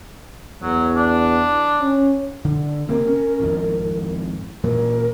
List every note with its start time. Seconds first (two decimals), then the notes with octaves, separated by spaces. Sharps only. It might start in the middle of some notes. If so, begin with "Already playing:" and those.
0.62 E2 F#3
0.96 D4
1.81 C#4
2.45 D3
2.89 C3 A#3 C4 A#4
3.07 C#4
3.40 G#1 F2 A2
4.64 A#2 E3 F#3 A#4